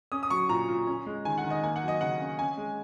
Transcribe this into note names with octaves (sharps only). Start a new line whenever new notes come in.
C#4 D#6
D#6
F#3 C#6
A#2 A#5
A#2
C#4
G#3
D#3 G#5
F#5
D#3
D#5
A#3 G#5
F#5
F#3
D#5
C#3 F#5
C#4
C#4 G#5
G#3